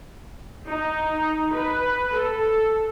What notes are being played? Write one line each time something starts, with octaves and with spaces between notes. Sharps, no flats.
D#4
B4
A4